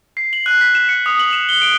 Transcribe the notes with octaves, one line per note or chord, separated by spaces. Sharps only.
C7
F#7
F#6
B6
E7
C#7
D#6
F#7
E7
G7
D7